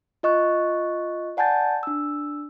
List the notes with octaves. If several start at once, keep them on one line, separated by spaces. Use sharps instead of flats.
F4 D#5 C#6 F#6
D5 F#5 G#5 A5 G6 A6
D4 E6